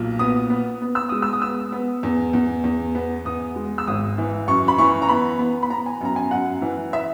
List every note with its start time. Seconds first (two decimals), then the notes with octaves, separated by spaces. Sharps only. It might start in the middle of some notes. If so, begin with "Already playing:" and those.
Already playing: B1 A#2
0.19 B3 D#6
0.50 B3
0.82 B3
0.95 E6
1.09 G#3 D#6
1.22 E6
1.33 D#6
1.42 B3 E6
1.72 B3
2.03 E2
2.33 E2
2.64 E2
2.95 B3
3.25 E2 D#6
3.56 G#3
3.78 E6
3.87 G#1 D#6
4.18 E3
4.48 F#2 C#6
4.68 B5
4.78 E3 C#6
5.02 A#5
5.09 B3 B5
5.39 B3
5.63 B5
5.70 B3 A#5
5.86 G#5
6.01 F#2 A#5
6.16 G#5
6.31 F#2 F#5
6.62 E3
6.93 E5